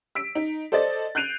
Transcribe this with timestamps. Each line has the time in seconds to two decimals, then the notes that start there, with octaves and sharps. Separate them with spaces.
0.15 E6 B6 D7
0.35 D#4
0.72 A4 C5 D5 D#5 A6
1.15 F#6 G6 C7 D7 D#7 F7